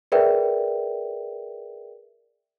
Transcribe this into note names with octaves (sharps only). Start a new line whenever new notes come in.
G#4 A#4 B4 D5 E5 G5